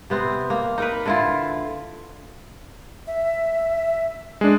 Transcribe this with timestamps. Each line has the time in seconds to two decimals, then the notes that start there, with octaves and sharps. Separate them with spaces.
0.10 C3 B3 C4
0.50 A#3
0.78 D#4 A#4 B4
1.06 D3 E4 F4
3.07 E5
4.41 G#3 D4